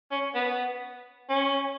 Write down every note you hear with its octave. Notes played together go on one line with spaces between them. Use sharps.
C#4
B3
C#4